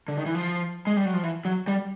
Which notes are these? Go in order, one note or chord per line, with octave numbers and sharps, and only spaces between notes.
D3
D#3
E3
F3
G#3
G3
F#3
F3
E3
F#3
G3